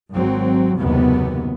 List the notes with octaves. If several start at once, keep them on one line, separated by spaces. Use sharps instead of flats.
G#1 F#3 C4
F#1 D#2 G#2 C3 B3